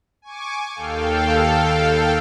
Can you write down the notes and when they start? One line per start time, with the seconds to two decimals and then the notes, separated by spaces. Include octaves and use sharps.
0.22 G#5 C#6 D6
0.74 D#2 A4 F5 G5